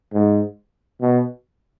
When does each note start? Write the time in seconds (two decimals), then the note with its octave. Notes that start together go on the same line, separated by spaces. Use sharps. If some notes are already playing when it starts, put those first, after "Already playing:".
0.12 G#2
1.01 B2